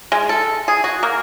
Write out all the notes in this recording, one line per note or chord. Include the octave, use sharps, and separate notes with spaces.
G#3
A4
G#4
F#4
A#3